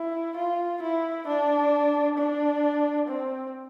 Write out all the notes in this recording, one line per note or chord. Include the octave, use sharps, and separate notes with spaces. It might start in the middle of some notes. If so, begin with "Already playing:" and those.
Already playing: E4
F4
E4
D4
D4
C4